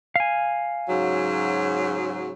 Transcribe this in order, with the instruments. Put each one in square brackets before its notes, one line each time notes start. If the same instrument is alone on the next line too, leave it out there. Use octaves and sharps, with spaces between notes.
[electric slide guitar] F5 G#5
[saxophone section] G#2 C#3 F#3